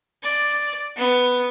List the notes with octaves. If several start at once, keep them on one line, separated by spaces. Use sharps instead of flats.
D5
B3